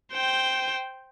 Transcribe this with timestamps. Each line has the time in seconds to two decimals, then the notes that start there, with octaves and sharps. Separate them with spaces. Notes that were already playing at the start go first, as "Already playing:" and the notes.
0.13 C5 G5